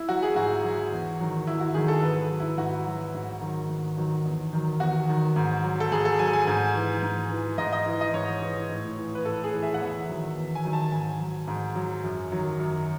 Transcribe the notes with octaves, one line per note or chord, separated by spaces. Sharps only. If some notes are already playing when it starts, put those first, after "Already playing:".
Already playing: E4
F#3 F#4
G#4
G#2 F#4
F#3
E2
D#3 F#3
E2 E4
F#4
D#3 F#3 G#4
A4
G#2 B4
F#3
E4
G#2 F#4
F#3
G#2
D#3 F#3
G#2
D#3 F#3
E2
D#3 F#3
E2 F#4
D#3 F#3
G#2
F#3
A4
G#2 G#4
A4
F#3 G#5
G#5
G#2 G#5
E3
G#2
E3
G#2 D#5
D#5
E3
D#5
G#2 C#5
E3
A2
E3
B4
A2 A4
G#4
E3
E5
F#5
E2 E5
D#3 F#3
E2
G#5
D#3 F#3
A5
G#2 G#5
F#3
G#2
F#3
F#2
D#3 F#3
F#2